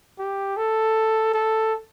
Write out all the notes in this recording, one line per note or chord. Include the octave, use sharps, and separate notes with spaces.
G4
A4
A4